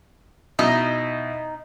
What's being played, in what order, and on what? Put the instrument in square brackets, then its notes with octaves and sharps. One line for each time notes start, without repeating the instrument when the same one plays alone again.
[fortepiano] B2 E4 D#6 [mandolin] D#4